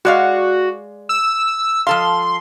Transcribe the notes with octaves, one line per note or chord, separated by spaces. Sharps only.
G#3 F#4 D5 F5
E6
F3 A4 F5 C6